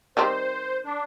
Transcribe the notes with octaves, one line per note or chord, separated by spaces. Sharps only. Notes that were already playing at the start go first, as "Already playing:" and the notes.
D#3 G3 C4 C5
D4